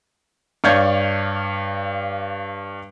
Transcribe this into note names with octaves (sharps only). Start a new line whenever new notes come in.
G2 C#5 D5 F5 G6 G#6